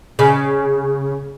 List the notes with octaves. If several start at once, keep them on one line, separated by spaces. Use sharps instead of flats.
C#3